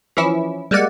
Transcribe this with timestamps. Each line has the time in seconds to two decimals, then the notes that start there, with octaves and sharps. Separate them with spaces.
0.17 E3 F3 C#4 E4
0.71 G3 G#3 A#3 D5 F#5